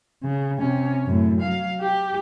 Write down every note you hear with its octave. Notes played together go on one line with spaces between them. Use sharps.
C#3
C3 C#4
F#2 A2
F#3 F5
G4